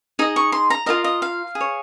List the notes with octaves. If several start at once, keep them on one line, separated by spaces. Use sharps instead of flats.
D#4 G#4 D#5
C#6
C6
A#5
F4 A#4 D#5 F5
D#5
F5
G#4
C#5